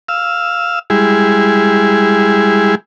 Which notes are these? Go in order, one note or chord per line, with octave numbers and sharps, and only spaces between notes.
F5 E6
G3 G#3 E4 G#4